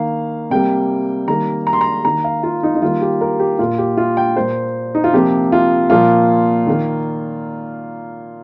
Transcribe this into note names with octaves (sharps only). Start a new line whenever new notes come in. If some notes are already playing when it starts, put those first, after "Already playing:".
Already playing: D#3 A#3 F5
C3 G3 A#3 G5
D#3 G3 A#3 A#5
A#5
C6
A#5
D#3 A#3 A#5
F5
F4
D#4
D#4
D#3 G3 A#3 F4
G4
A#4
G4
A#2 A#3 F4
G4
F4
G5
A#2 A#3 C5
D#4
F4
C3 F3 A#3 G4
F4
A#2 F3 A#3 F4
D#3 A#3